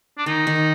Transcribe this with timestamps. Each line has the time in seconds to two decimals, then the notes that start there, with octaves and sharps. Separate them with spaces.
0.18 D4
0.26 D#3 D#4
0.47 D#3